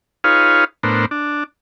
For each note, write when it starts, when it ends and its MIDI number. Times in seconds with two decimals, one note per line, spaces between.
0.24 0.64 63
0.24 0.64 65
0.24 0.64 68
0.24 0.64 71
0.24 0.64 73
0.24 0.64 77
0.83 1.05 45
0.83 1.05 59
0.83 1.05 62
0.83 1.05 70
0.83 1.05 72
1.11 1.44 62